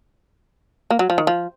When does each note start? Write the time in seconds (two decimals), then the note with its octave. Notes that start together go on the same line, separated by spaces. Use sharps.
0.91 A#3
0.99 F#3
1.10 F3
1.18 D#3
1.27 F3